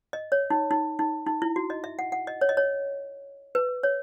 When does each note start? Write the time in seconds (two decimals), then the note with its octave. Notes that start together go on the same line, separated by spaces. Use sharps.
0.13 D#5
0.32 C#5
0.50 D#4
0.71 D#4
0.99 D#4
1.27 D#4
1.42 E4
1.56 F#4
1.70 D#5
1.84 E5
1.99 F#5
2.12 F#5
2.27 D#5
2.41 C#5
2.49 D#5
2.57 C#5
3.55 B4
3.83 C#5